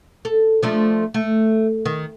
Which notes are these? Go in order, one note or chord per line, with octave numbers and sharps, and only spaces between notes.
A4
F3 A3 D4
A3
D#3